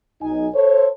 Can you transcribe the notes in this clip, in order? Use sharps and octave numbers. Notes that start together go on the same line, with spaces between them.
B1 D#4 G#5
A4 C5 C#5